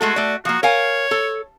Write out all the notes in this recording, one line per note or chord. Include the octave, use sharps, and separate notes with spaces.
G#3 A3 F#4 A4
A3 D5
F3 A#3 F#4
A#4 C#5 F5 G#5
A4